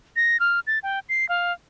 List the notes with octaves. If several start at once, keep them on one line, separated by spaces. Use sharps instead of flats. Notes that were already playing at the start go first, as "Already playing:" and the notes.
A#6
F6
A6
G5
C7
F5